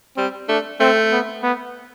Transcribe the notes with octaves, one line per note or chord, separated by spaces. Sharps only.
G3 C4
A3 D4
A3 C4
B3
B3